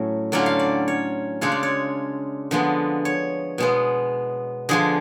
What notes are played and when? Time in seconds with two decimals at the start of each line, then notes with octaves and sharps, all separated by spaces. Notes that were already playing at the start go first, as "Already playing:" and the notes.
Already playing: A2 F#3 A3 C#4
0.32 D3 F#3 C#4 F4 D5
0.46 F5
0.59 D5
0.88 C#5
1.41 C#3 G#3 D4 F4 C#5
1.52 D5
1.63 C#5
2.51 D3 F3 G#3 B3
3.05 C#5
3.58 B2 G#3 B3
4.69 D3 F3 G#3 G#4